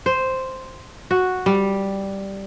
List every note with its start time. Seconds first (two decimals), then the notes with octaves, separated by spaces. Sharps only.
0.06 C5
1.11 F#4
1.46 G3